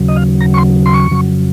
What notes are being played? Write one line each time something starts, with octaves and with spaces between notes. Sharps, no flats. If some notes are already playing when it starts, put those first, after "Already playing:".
Already playing: D#2 C#3 F#3
D#5
F5
A#5
C#6
C6
C6
C#6
F2 C#3 F#3